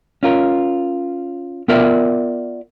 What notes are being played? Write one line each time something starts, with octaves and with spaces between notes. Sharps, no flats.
C#4 F4 A#4
B3 F4 A#4 D5 E5